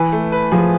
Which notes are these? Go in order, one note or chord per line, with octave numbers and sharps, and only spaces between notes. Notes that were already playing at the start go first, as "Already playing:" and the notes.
Already playing: E3 B4
A3
B4
F3 G#4